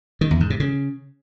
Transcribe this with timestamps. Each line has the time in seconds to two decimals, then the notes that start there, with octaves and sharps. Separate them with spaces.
0.21 D#3
0.31 E2
0.40 G#2
0.50 C3
0.60 C#3